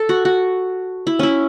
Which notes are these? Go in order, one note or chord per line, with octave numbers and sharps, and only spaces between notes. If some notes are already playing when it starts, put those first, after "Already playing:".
Already playing: A4
F#4
F#4
E4
C#4 E4